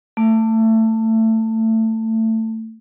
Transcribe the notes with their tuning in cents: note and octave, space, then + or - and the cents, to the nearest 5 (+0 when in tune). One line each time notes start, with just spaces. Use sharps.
A3 +20